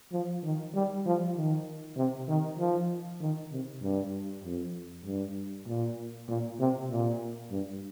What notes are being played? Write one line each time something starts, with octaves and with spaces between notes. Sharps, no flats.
F3
D#3
G3
F3
D#3
C3
D#3
F3
D#3
C3
G2
F2
G2
A#2
A#2
C3
A#2
G2